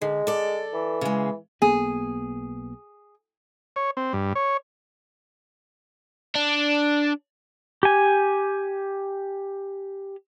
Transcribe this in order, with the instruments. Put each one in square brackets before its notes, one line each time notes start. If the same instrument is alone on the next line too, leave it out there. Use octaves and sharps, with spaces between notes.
[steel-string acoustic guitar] D3 [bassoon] G#3
[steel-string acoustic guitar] A4 D5
[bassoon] E3
[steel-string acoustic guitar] C#3 G#3
[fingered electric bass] B1 A#3 B3 [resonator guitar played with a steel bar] G#4
[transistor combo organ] C#5
C4
G2
C#5
[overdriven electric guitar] D4
[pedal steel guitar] G4 G#5